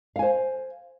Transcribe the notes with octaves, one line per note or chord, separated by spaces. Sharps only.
C5 F5 G#5